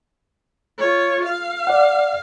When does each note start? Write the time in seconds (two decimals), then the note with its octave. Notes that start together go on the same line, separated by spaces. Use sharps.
0.78 F4 C#5
1.24 F5
1.67 D5 F#5